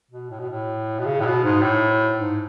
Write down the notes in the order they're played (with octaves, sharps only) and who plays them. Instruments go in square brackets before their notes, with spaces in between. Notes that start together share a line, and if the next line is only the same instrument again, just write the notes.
[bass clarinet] B2
A2
B2
A2
B2
C#3
A2
B2
G#2
A2
G#2